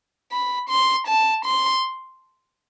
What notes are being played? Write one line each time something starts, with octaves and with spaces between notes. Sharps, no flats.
B5
C6
A5
C6